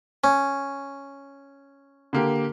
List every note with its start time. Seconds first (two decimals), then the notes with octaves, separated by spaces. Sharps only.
0.24 C#4
2.13 D3 A#3 G4